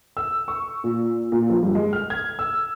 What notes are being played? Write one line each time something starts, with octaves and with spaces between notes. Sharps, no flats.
E6
C#6
A#2
A#2
F3
G2
G#3
F6
G#6
E6